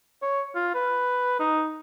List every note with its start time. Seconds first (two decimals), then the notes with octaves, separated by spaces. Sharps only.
0.22 C#5
0.55 F4
0.74 B4
1.40 D#4